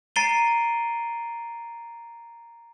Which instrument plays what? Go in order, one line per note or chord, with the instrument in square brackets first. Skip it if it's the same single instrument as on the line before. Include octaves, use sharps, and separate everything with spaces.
[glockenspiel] A#5 A6 C7 D7 D#7 G7